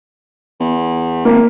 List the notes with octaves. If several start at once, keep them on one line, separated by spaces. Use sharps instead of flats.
E2
G#1 A#3